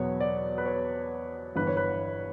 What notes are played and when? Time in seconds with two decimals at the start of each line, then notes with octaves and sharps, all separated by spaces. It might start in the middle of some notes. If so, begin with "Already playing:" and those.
Already playing: E2 B2 F#3 B3 C#5
0.20 D5
0.58 B4
0.66 C#5
1.55 G1 G2 E3 B4
1.67 C#5
1.77 B4